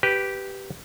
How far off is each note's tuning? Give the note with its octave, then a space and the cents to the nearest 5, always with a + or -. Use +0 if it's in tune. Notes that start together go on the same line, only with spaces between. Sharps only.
G4 -5 B4 +0